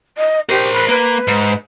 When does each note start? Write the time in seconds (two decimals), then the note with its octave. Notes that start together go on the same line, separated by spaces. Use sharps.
0.18 D#5
0.49 G4 A#4 C5
0.73 B5
0.88 A#3 B4
1.28 G#2